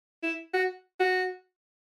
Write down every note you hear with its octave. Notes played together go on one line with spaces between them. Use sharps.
E4
F#4
F#4